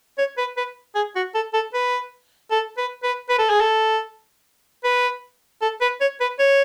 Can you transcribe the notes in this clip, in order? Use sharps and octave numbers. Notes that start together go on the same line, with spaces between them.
C#5
B4
B4
G#4
F#4
A4
A4
B4
A4
B4
B4
B4
A4
G#4
A4
B4
A4
B4
C#5
B4
C#5